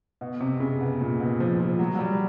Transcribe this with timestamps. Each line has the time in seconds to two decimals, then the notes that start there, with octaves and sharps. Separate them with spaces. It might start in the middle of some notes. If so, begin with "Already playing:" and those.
0.21 B2
0.40 C3
0.60 C#3
0.81 B2
1.01 A#2
1.20 B2
1.40 F3
1.60 F3
1.79 F#3
1.95 F#3
1.99 G3